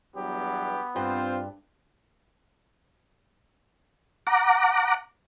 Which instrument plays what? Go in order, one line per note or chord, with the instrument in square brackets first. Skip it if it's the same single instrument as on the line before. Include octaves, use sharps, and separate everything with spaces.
[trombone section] E2 G2 F#3 [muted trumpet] B3 [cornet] G4
[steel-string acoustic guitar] G2 [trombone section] C4 F4 [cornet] C5
[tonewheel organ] F#5 A#5 D6